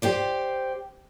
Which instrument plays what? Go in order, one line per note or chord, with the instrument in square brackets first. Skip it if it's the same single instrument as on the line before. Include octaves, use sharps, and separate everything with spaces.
[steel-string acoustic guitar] G4 C5 D5